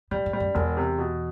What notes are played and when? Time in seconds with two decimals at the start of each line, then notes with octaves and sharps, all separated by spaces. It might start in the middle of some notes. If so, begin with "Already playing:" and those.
0.11 A2 G3
0.26 A2
0.33 G3
0.40 F#2
0.55 E1 E2
0.77 C3
0.98 B2